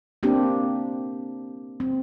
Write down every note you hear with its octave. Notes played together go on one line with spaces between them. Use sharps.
A#3 C4 D4 G4
C4